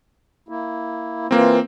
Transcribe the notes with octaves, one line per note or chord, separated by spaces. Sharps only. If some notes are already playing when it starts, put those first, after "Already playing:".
A#3 E4
E3 A#3 C4 F4